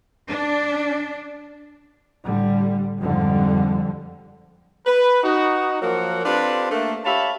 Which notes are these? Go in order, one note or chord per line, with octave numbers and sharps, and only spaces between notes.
D4
A2 D3 G3
F2 G#2 D3 F3 G3
B4
D#4 F#4
F3 F#3 A#3 A#4 F#5
C4 D4 F4 G4 A4 B4
A3 A#3 D4
G4 C#5 E5 F5 A5 B5